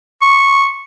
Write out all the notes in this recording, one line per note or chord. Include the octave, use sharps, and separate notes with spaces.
C#6